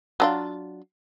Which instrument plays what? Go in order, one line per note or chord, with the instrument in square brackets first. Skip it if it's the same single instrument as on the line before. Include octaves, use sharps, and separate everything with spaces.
[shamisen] F#3 D4 F4